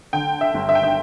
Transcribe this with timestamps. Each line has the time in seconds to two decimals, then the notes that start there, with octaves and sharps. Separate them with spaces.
0.13 D3 G5
0.41 E5
0.54 G1
0.69 E5
0.75 G5
0.84 E5